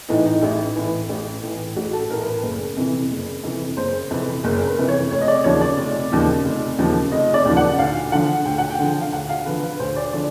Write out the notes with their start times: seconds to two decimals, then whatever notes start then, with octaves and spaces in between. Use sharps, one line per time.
0.09 A2 E3 D#4
0.26 D#4
0.42 A1 E4
0.76 A2 E3
1.09 A1
1.42 A2 E3
1.76 A1 F#4
1.93 A4
2.10 E3 A#4
2.13 A2
2.21 A#4
2.26 B4
2.43 F#1
2.77 F2 C3 E3
3.11 F#1
3.43 F2 C3 E3
3.77 F#1 C5
4.10 F2 C3 E3 B4
4.44 F#1 A#4
4.60 A#4
4.67 B4
4.78 F2 C3 E3
4.88 C#5
5.11 F1 C#5
5.21 D#5
5.28 D5
5.44 D#2 C#3 F3 C#5
5.61 D5
5.78 F1
6.12 D#2 C#3 F3
6.45 F1
6.78 D#2 C#3 F3
7.12 F1 D#5
7.34 D5
7.45 D#2 C#3 F3
7.57 F#5
7.79 D2 F5
8.12 D3 F3 F#5
8.45 D2 G5
8.58 F#5
8.70 G5
8.79 D3 F3
9.01 F5
9.12 D2 F#5
9.29 F5
9.46 D3 F3 B4
9.63 B4
9.79 D2 C5
9.96 D5
10.13 D3 F3 D5